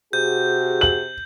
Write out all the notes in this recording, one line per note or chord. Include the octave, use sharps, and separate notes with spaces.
C3 F#4 G#4 G6
F#7